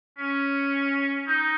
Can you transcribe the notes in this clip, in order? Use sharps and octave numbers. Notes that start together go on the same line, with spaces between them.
C#4
D#4